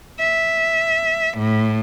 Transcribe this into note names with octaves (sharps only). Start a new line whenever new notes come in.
E5
A2